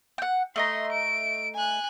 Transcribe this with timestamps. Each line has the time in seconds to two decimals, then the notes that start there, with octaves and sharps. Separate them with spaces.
0.18 F#5 G5
0.56 A3 D#5 A#5 C6
0.92 D7
1.55 G#5 F#6